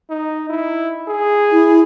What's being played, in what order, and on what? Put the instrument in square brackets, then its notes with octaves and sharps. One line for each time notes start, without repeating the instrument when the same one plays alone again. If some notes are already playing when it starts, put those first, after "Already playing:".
[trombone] D#4
E4
G#4
[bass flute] E4